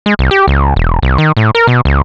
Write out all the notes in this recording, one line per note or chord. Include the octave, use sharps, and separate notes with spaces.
G#3
C2
G4
C#2
E1
C2
D#3
A2
A#4
B2
C#2